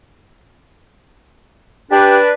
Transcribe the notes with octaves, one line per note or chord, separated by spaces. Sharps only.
D4 G4 B4